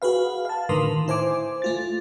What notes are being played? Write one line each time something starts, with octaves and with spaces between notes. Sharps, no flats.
F#4 G#4 B4 F5
F5 A5
A2 D3 D#3 A#4 B4 C6
E4 C5 G#5 D6
A3 F4 A6